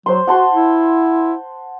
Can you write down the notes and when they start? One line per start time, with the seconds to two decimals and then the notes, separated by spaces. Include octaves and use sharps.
0.06 F#3 C5 C6
0.27 F#4 F#5 A5 C6
0.52 E4